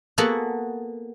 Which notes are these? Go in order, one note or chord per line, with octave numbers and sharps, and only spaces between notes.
A#3 B3 F#4 G#4 A4 F#5